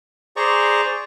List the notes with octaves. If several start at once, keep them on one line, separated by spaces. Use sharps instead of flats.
G#4 C5 D5 A#5 C#6